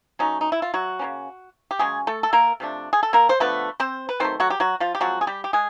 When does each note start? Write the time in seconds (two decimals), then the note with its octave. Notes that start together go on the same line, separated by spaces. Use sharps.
0.19 F#3 A3 C#4 D#4
0.41 D#4
0.52 E4
0.62 F4
0.74 F#3 F#4
0.99 C#3 F3 A#3 C#4
1.71 G4
1.79 C#3 F#3 G#3 C#4 G#4
2.07 A3 A4
2.23 A4
2.33 A#3 A#4
2.60 C3 F3 A3 D4
2.93 G#4
3.03 A4
3.13 A#3 A#4
3.29 C5
3.40 D3 F3 A3 B3 B4
3.80 C4 C5
4.09 B4
4.20 D#3 F#3 A3 C4 C5
4.40 F#3 F#4
4.50 G4
4.60 F#3 F#4
4.80 F3 F4
4.95 G4
5.00 F3 F#3 G#3 C4 F#4
5.21 G#4
5.27 G3 G4
5.44 G4
5.53 G#3 G#4